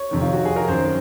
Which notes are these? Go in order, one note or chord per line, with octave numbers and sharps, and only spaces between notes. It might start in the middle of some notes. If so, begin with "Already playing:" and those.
Already playing: C#5
F2 C3 D#3
F4
F#4
G#4
A#4
F#2 D#3 C5